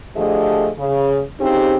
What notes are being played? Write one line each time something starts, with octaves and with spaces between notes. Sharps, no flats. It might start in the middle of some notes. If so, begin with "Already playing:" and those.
D3 F3 A3 G4 G#4 D#5
C#3
F2 C#3 C4 D#4 G4